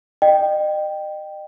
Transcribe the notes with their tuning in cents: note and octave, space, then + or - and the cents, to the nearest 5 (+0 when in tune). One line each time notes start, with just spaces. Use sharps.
D#5 -35 G5 -5